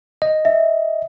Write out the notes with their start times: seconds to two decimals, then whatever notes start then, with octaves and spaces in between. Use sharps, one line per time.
0.22 D#5
0.45 E5